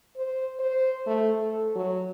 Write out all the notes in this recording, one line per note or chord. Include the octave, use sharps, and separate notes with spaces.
C5
C5
A3
A4
F#3